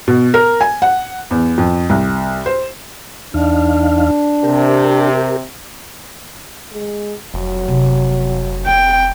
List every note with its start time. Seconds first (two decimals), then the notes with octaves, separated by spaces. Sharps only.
0.08 B2
0.34 A#4
0.61 G#5
0.82 F#5
1.31 E2
1.58 F2
1.90 C2
2.46 C5
3.34 E2 D4 D#4 F5
4.43 C3 G4 A#4
6.73 G#3
7.34 F1 F#3
7.67 C3 B3
8.67 C4 G5